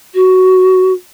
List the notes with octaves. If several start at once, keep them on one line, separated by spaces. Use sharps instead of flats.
F#4